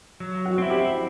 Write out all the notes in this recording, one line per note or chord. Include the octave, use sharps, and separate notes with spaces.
F#3
F#4
C4 E4
G4